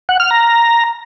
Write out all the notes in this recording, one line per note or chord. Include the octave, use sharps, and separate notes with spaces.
F#5
F6
A#5